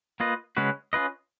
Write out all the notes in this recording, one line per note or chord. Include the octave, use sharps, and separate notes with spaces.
A#3 F4 B4 D#5
C#3 G#3 C#4 F#4 B4
C#4 F4 B4 D#5